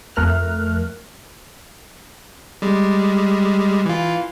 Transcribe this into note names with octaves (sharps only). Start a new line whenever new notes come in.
F2 A3 A#4 F6 F#6
G3 G#3
E3 F4